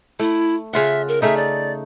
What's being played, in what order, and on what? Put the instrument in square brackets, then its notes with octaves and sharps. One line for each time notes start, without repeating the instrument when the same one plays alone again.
[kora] A3 [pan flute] E4
[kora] C#3 F4 F#5 [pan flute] E5
[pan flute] A#4
[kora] C#3 A3 D#4 [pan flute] E5
[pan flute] D5